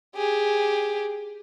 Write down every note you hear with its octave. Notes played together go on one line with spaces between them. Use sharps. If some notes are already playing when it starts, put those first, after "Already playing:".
G4 G#4